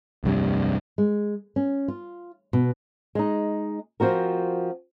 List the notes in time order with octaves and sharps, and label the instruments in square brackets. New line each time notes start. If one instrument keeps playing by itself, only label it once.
[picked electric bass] F1 C2 G2 C3
[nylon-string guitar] G#3
C#4
F4
B2
G#3 D#4
F3 C4 F#4 A#4